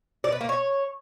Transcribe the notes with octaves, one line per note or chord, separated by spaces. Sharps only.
D5
B4
A#3
C#5